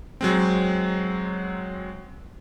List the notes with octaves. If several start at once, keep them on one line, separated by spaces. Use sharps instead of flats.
F#3 G#3 C4